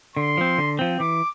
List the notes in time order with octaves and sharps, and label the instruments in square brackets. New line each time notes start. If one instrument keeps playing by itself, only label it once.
[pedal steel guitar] D3 [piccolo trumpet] C6
[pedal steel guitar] F3 C4
D3
F3 C4
[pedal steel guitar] E3 [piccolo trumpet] D6